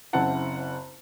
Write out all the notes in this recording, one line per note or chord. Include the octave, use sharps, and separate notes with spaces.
F#1 C#3 C4 E4 F#5 A5